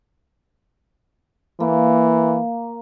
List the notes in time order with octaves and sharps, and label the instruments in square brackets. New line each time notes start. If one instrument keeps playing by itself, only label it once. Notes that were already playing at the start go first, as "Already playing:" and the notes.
[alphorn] E3 [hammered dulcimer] A#3